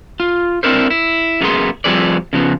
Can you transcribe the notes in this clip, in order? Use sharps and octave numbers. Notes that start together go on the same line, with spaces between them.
F4
C4 D4 E4 A#4 C5
E4
F#2 G3 A#3 B3 G#4 C6
F3 G3 C4 G#4 B4 D5
C#3 F3 B3